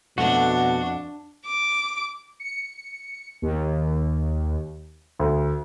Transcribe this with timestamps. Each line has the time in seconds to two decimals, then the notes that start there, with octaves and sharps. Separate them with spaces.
0.18 F2 B2 A3 D4 F#4 F#5
1.47 D6
2.39 C#7
3.42 D#2
5.19 D2